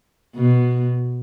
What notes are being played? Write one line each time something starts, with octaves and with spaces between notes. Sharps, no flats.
B2